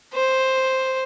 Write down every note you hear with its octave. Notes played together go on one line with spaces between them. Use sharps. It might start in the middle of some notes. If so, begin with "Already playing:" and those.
C5